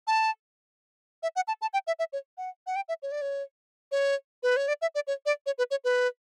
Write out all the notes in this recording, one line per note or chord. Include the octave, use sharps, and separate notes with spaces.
A5
E5
F#5
A5
A5
G5
E5
E5
C#5
F#5
F#5
G5
E5
C#5
D5
C#5
C#5
B4
C#5
D5
E5
D5
C#5
D5
C#5
B4
C#5
B4